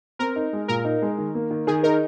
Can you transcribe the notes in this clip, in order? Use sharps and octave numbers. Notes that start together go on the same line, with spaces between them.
C4 A#4
D#4
G#3
A#2 A#4
D#4
G#3
D#3
A#3
D#3
D#3 G#4
D#4 A#4